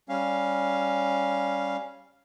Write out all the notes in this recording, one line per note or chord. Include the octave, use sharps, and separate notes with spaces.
G3 C#4 F5